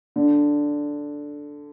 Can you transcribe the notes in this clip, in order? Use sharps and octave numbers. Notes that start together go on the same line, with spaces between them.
D3